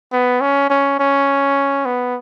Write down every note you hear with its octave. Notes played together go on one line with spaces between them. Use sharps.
B3
C#4
C#4
C#4
B3